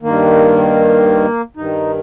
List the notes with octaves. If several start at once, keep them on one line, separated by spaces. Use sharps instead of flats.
G2 D#3 A#3
G2 D#3 D#4